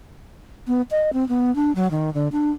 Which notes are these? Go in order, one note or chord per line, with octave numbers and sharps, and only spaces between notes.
B3
D#5
C4
B3
D4
F#3
D#3
D3
D4